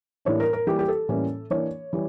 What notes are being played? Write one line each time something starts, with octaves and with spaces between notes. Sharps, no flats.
A2 E3 G3 A#3 D4 C#5
A#4
A#4
E3 G3 A#3 G4
G4
A4
A2 E3 G3 A#3 C#4
E3 A#3 D4 C#5
E3 G3